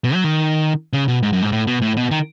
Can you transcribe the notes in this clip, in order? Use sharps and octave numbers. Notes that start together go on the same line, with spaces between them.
B2
F#3
D#3
C#3
B2
G#2
F#2
G#2
A2
B2
A2
B2
D#3